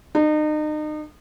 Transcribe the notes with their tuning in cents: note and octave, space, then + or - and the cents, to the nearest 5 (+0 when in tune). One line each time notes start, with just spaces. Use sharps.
D#4 -35